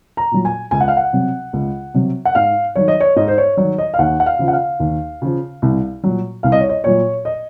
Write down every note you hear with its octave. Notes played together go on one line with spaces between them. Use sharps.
A#5
A#2 F#3
G#5
C#2 G#5
F#5
F5
F#5
C3 F#3
C#2
C3 F#3
F#5
G#2 F5
D#3 F#3 C#5
D#5
C#5
G#2 D#5
C5
C#5
D#3 F#3 C#5
D#5
F5
D#2 F#5
F#5
F5
C#3 F3
F#5
F5
D#2
C#3 F3
C2
A#2 F#3
C2 F5
D#5
C#5
D#5
A#2 F#3 C#5
D#5